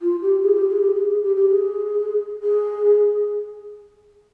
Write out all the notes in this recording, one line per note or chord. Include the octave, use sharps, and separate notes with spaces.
F4
G4
G#4
G4
G#4
G4
G#4
G#4
G4
G4
G#4
G#4